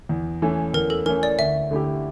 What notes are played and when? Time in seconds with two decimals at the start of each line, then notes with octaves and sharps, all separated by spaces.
0.09 E2
0.42 E3 A3 C#4
0.74 E2 A#4
0.90 A4
1.06 E3 A3 C#4 A#4
1.23 D5
1.38 D2 E5
1.71 D3 A3 E4 G4